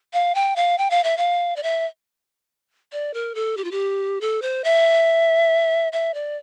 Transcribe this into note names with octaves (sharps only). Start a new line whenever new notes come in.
F5
G5
F5
G5
F5
E5
F5
D5
E5
D5
A#4
A4
G4
F4
G4
A4
C5
E5
E5
D5